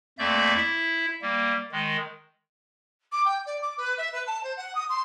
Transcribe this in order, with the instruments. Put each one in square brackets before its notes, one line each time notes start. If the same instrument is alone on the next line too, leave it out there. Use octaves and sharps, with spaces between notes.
[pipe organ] F2 A3 A#3 D5 E5 G6
E4 E5
G3 A#3
D#3 G#3
[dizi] D6
G5
D5
D6
B4
E5
B4
A5
C5
F#5
D#6
C6